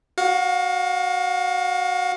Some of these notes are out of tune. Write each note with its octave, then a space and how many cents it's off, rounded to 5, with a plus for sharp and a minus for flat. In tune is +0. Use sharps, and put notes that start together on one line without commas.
F#4 +5 F5 +35